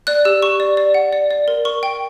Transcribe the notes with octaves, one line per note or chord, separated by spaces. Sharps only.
D5 F#6
G4 E6
G4 C#6
D5
D5
F#5
D5
D5
A#4
A#4 C#6
G5